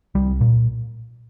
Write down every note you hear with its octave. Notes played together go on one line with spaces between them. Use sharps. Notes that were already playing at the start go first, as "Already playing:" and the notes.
C2 G3
A#2